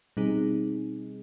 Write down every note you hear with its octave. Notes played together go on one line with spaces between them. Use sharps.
B2 G3 C4 D#4 G#4